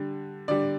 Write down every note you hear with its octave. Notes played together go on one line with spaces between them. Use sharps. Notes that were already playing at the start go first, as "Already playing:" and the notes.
Already playing: D3 G3
D3 G3 D5